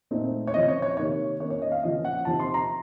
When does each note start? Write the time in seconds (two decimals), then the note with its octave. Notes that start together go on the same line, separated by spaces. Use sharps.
0.11 A#2 A3 C4 D#4
0.47 C#5
0.54 C#3 F3 C4 D#5
0.68 C#5
0.82 C#5
0.97 C3 D#3 A#3 D#4 C#5
1.40 D#3 A#3 C#4 C#5
1.50 C#5
1.62 D#5
1.72 F5
1.83 C#3 F3 A#3 C#4 D#5
2.05 F#5
2.25 C3 F3 C4 D#4 A5
2.39 C6
2.54 A#5